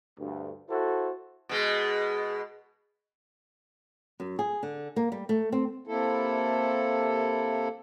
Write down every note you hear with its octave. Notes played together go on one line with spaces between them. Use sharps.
D2 G2
E4 F#4 A4 C5
B2 G#3
F#2
G#4
D3
A#3
G3
A3
C4
C3 A#3 E4 A4